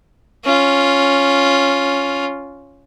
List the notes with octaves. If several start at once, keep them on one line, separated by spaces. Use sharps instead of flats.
C#4 F4